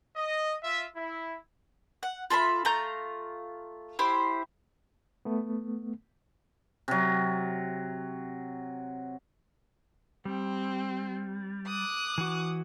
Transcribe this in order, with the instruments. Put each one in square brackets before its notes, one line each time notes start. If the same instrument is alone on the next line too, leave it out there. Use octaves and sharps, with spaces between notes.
[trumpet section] D#5
F4 E5
E4
[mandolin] F#5
F4 A4 E5 B5
A3 F4 A#5 G6
E4 G4 C5
[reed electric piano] A3 B3
[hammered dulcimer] C3 F#3
[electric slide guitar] G3 [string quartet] C4
[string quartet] D6 D#6 F#6
[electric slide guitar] E3 F#4